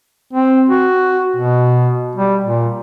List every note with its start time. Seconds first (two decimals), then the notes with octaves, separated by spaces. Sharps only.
0.33 C4
0.69 F#4
1.36 B2
2.15 G3
2.44 A#2